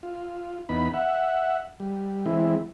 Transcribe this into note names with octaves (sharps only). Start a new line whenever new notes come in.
F4
E2 B3 D#4 B5
E5 F#5
G3
E3 G#3 C4 E4